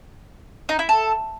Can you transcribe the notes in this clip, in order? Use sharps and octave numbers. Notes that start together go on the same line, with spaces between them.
D#4
E4
A4